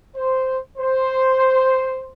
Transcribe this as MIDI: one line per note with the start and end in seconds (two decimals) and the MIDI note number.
0.17 0.59 72
0.78 2.11 72